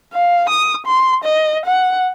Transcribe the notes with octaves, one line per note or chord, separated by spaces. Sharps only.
F5
D#6
C6
D#5
F#5